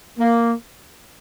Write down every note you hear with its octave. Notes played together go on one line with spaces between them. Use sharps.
A#3